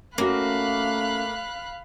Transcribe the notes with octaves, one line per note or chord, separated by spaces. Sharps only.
A3 A#3 C#4 F#4 F5 B5 F#6